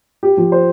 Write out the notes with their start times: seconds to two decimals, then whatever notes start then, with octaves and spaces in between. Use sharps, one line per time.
0.23 G4
0.37 F3
0.52 C5